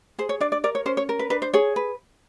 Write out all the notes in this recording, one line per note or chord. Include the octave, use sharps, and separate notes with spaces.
G#4 C5
C#5
D4 D5
D5
A#4 D5
C#5
C#4 C5
C#5
A#4
B4
D4 B4
C5
G#4 C#5
B4